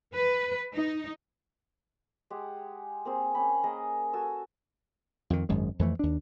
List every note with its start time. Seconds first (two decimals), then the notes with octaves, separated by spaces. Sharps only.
0.14 B4
0.74 D#4
2.30 G#3 G4 G#4 F#5
3.05 A#3 C4 G#4
3.34 C#4 G5 B5 C6
3.63 A#3 G#4 A#4 D#5
4.13 F#4 A4 G#5 E6
5.30 F2 D#3
5.49 G#1 F#2 G#3
5.79 F2 E3 A3
5.99 D#2 D4